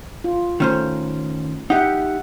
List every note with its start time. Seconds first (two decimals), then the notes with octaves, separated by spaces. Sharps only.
0.24 F4
0.60 D#3 A3 C#4 C5
1.70 D#4 G4 E5 F#5